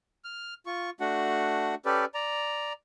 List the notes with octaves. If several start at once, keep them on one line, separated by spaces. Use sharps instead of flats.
F6
F4 C#6
A3 D4 F#4 F#5
C#4 G4 A4 B4 D5
D5 A#5